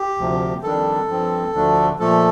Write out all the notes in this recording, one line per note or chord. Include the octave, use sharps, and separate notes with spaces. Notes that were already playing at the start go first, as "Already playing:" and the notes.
Already playing: G4
D2 C3 F3
F2 D#3 G3 D4 A4
G2 F3 C4
D2 D3 F3 A3 D4
A#2 F3 A3 A4